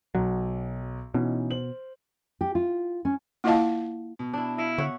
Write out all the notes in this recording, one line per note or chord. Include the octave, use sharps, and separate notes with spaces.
B1 F#3
B2 E3 C#4 D#4
C5 F#7
G4
F4
C#4
A#3 E4 F4 D#5 F5 A5
B2
D4 E4
E4 D#5 F5
D3 C#5 E5 F#5